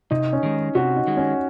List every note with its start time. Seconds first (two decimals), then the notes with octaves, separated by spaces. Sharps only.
0.11 C3 D#4
0.33 C#4
0.43 D#3 G#3
0.75 C3 F#4
0.96 D#4
1.07 D#3 G#3
1.17 C#4